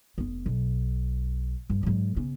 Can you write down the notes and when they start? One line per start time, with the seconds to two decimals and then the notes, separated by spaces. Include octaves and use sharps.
0.18 F1 B3
0.46 B1
1.70 G2
1.83 G#2 F#3
2.16 C#3 B3